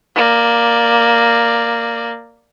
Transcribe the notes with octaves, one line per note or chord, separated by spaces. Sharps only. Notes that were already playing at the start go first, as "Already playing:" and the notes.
A#3 D5